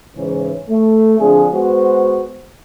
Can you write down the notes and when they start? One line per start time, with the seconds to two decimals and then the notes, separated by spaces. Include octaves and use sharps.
0.16 G#2 C#3 E3 C#4
0.69 A3
1.18 D3 F3 C4 D4 G#4
1.52 G#3 B3 F#4 C5